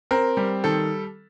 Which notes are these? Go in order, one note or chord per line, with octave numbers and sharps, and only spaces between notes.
C4 A#4
G3
D#3 A4